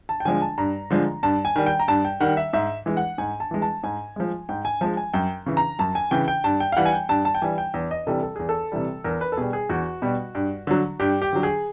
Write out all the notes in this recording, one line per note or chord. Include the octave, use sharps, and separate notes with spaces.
A5
G5
D3 F3 G#3 G#5
A5
G2 A#5
D3 F3 G#3
G2 A5
G#5
D#3 G3
G5
A#5
G2 A5
G5
D#3 G3 F#5
E5
G#2 E5
E3 G#3
F#5
G#2 G#5
A5
E3 G#3
A5
G#2 G#5
F3 G#3
G#2 G5
G#5
F3 G#3 A5
G#5
F#2 G5
C#3 E3
A#5
F#2 A5
G#5
C#3 E3 G5
G5
G2 A5
G5
F5
E3 G3 F#5
G#5
G5
G2 A5
A5
G5
E3 G3 G#5
G5
E2
D#5
C3 E3 G3 A4
A4
E2 G#4
A4
C3 E3 G3
E2 A#4
B4
A4
B2 G3 G#4
G#4
E2 F#4
B2 G3
G2
D3 F#3
G2 G4
G4
D3 F#3
G#4